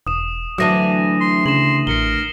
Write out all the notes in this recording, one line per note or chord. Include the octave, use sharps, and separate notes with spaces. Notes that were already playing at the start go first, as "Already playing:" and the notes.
E1 D#6 E7
D2 E3 F#3 D4 D#6 A#6 D#7
C6
C#3 C6 E7 F#7
A1 A#4 C7 C#7 G7